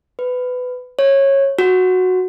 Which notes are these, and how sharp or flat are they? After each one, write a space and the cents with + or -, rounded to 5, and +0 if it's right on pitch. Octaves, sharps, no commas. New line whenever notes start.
B4 +20
C#5 -15
F#4 -5